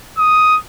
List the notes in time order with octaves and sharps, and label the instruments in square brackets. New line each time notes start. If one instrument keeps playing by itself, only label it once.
[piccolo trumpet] D#6